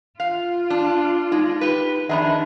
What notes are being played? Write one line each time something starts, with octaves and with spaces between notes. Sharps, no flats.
F4 F5
D4
G#3 D#4
G4 B4
F2 D#3 D4 G#4 E5 A#5 B5